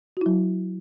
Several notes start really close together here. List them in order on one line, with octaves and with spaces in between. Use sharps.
F#4 E4 F#3